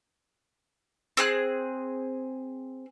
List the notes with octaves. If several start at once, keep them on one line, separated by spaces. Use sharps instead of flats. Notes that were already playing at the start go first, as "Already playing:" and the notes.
C4 G#4 F#6